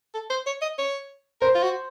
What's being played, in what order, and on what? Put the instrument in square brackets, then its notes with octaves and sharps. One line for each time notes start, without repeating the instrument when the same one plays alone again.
[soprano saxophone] A4
C5
C#5
D#5
C#5
[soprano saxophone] A#4 [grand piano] C5
[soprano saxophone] F4
F#4